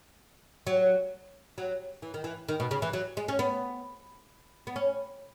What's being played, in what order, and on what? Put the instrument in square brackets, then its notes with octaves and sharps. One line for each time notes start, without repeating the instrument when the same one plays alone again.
[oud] F#3
F#3
E3
D#3
E3
D#3
B2
C#3
E3
F#3
G#3
C#4
B3
B3
C#4